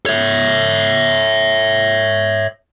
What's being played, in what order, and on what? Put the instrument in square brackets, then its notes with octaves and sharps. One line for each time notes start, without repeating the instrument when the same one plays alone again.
[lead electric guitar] C#5 E5